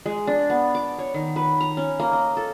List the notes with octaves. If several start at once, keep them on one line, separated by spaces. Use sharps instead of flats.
G#3
D4
B3
D6
C#5
D#3
B4
A#5
C#4
A#3
D#5
A4